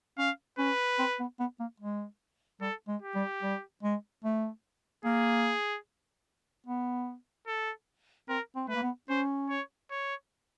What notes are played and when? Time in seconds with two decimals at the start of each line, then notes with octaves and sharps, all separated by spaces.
0.18 C#4 F5
0.58 C#4 B4
0.99 C4
1.20 B3
1.40 B3
1.60 A#3
1.80 G#3
2.61 G3 A4
2.88 G#3
3.02 G4
3.15 G3
3.42 G3
3.83 G#3
4.24 A3
5.05 A#3 G#4
6.66 B3
7.47 A4
8.28 C4 A#4
8.56 C4
8.68 A3 B4
8.75 A#3
8.82 B3
9.09 C#4 C5
9.49 C#5
9.90 C#5